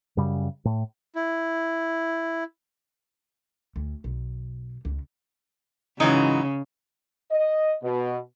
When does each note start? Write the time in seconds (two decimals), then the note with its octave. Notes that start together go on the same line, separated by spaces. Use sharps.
0.17 F#2 C#3 G3
0.65 A2
1.15 E4
3.76 D2
4.04 B1
4.85 C#2
6.00 G#2 C#3 E3 F#3 D#4
7.32 D#5
7.83 B2